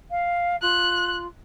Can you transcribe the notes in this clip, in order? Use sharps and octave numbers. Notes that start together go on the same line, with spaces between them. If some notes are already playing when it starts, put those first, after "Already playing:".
F5
F4 F#6